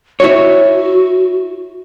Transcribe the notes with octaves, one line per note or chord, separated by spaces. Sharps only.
E4 F#4 C#5